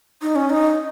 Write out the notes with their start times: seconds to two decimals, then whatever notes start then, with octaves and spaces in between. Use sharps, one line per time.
0.22 D#4
0.36 C#4
0.50 D#4